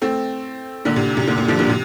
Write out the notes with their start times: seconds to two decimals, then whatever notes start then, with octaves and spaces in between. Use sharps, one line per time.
0.02 A3 C4
0.85 A#2 D3
0.96 C3
1.17 C3
1.27 A#2 D3
1.37 A#2
1.48 D3 F3
1.59 A#2 D3
1.69 C3